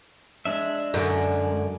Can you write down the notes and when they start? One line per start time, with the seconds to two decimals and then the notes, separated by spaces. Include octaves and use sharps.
0.45 G#3 D4 E5
0.94 F#2 D3